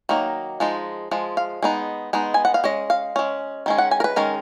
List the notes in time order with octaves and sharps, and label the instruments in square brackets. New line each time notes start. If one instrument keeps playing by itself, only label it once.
[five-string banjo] D#3 F#3 A#3 D#4
F3 G#3 D#4
F3 G#3
F5
G#3 B3 D#4
G#3 B3 D#4
G#5
F#5
F5
G#3 C#4 D#5
F5
G#3 C#4
D#3 G#3 C#4
F#5
G#5
A#4
B4
D#3 G#3 C#4 A#4